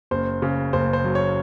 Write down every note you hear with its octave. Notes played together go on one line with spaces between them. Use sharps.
F#1 C5
C#3
F#1 C5
C5
F#3
C#5